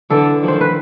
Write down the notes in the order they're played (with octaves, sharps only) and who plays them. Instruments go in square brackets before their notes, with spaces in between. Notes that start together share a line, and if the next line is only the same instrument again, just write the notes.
[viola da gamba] D3 E3 [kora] A4
[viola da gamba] D#3 F3
[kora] C5
B4